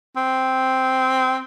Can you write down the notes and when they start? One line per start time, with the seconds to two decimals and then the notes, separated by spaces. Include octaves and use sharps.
0.16 C4